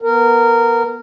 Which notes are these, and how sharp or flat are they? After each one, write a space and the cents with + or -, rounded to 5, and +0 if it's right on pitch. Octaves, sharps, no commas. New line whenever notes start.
B3 -25 A#4 -15